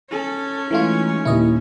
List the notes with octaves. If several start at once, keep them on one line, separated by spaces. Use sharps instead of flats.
C#4 A4
E3 G#3 A3 D#4 F4
D#2 A#2 E4 D#5